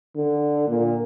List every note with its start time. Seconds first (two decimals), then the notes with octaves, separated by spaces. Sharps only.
0.16 D3
0.68 A#2